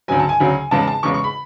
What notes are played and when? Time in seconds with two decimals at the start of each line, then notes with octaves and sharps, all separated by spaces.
0.08 D2 C#3 F#3 G#5
0.19 A5
0.29 G#5
0.40 D2 C#3 F#3
0.71 E2 C#3 G#3 A5
0.87 A5
1.03 E2 C#3 G#3 C#6
1.14 C#6
1.24 B5